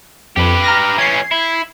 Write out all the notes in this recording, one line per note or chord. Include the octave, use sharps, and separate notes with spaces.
F2 G4 B4
A#5 F6 A#6
E3 C#4 G#6 C7
E4